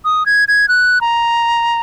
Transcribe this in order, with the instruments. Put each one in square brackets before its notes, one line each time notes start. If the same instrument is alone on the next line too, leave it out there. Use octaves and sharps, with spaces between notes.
[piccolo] D#6
G#6
G#6
F#6
A#5